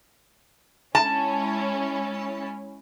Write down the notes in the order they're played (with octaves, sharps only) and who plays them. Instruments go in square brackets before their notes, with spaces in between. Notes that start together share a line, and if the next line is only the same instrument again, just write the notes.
[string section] G#3 C#4 E4 [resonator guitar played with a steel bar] A5